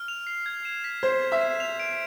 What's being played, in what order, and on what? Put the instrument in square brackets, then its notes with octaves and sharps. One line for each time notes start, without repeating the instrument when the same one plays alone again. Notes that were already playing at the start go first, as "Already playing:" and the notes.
Already playing: [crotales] F6
F7
C7
G#6
E7
B6
[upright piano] C5 [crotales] G#6
[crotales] G#6
[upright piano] E5
[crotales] E7
F7
D7